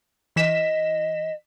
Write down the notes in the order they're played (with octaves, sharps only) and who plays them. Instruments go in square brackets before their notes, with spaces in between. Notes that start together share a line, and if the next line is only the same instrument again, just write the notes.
[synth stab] E3 B6 E7 [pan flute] D#5